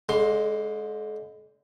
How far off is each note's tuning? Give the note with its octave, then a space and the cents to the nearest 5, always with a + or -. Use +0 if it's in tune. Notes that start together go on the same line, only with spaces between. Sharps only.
D3 -40 G#3 +0 C6 +15